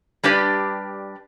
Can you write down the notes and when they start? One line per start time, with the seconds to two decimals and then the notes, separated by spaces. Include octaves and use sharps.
0.23 G3 D4 G4 B4 D5